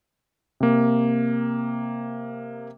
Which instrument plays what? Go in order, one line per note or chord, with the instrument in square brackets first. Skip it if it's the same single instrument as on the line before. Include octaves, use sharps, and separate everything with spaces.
[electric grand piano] C3 A#3